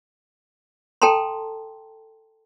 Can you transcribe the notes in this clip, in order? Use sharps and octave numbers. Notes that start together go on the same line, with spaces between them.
A4 G5 A5 A#5 C6